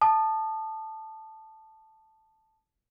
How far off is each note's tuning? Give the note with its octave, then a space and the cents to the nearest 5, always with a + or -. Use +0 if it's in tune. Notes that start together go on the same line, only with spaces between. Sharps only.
A5 +0 D#6 -30